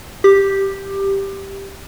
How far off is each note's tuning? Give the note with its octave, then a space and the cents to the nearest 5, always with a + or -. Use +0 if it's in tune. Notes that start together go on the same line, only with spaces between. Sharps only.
G4 +0 D6 +20